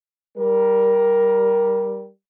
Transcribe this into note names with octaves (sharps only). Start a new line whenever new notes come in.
G3 A#4